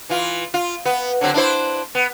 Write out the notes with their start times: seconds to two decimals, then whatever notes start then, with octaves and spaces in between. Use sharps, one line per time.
0.09 E3 F4
0.54 F4
0.85 B3
1.21 D3 F#3 C4
1.34 D4 E4 C5
1.95 B3